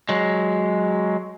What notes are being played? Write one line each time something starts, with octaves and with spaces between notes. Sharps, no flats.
F#3 G#3